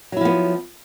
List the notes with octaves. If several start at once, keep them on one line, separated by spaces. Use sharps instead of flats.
F3 F#3 B3 E4